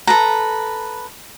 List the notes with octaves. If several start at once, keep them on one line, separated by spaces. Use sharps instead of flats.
A4 B4 A#5